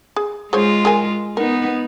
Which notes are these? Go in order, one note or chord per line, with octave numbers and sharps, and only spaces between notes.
G#4
G#3 F4 G#4 C5 C#5
G#4 A#4 G#5
B3 D#4 A#4